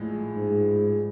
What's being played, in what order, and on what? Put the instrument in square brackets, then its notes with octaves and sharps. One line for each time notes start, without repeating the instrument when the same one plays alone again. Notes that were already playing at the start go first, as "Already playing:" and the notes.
Already playing: [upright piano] A#1 A2 F3 G#3
[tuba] G#2